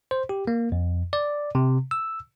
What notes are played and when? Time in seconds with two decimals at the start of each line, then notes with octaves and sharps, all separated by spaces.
0.11 C5
0.29 G4
0.47 A#3
0.72 F2
1.13 D5
1.55 C3
1.91 E6